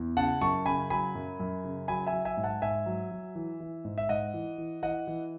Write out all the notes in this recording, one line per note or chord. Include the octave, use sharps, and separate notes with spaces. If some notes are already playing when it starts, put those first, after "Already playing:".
Already playing: E2
C#3 F#5 A5
F#2 A5 C#6
C#3 G#5 B5
F#3 G#5 B5
F#2
F#2
C#3
F#3 G#5 B5
E5 G#5
F#3
E5 G#5
G#2
F#5 A5
G#2 E5 G#5
F#3
F#3
E3
E3
G#2
E5
G#2 D#5 F#5
E3
E3
E3 D#5 F#5
E3